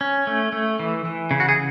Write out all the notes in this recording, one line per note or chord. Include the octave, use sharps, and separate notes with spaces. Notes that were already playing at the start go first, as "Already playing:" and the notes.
C#4
A3
A3
E3
E3
C#3
F#4
G#4